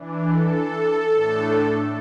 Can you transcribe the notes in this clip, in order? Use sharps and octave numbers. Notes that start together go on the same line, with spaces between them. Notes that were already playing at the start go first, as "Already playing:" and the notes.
Already playing: E3 D4
A4
A2 A3 D4